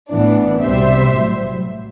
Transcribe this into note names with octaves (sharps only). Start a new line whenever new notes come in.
A1 A2 E3 B3 D4
C2 B2 G3 C5 E5
A1 A2 F#3